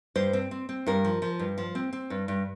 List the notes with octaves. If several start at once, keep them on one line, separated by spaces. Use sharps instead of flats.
G2 C5
C4
C4
C4
G2 A#4
F3
F3
G2
F3
C4
C4
G2
G2